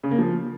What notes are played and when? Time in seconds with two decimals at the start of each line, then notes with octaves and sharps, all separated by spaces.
0.03 C#3
0.11 A#3
0.19 F3